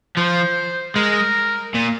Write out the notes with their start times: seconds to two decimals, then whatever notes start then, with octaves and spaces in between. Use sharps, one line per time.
0.17 F3 C5
0.96 G#3 A#4
1.74 A#2